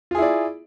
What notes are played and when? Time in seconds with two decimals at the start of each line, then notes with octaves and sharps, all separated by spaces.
0.11 F4
0.15 G#4
0.18 E4
0.22 D5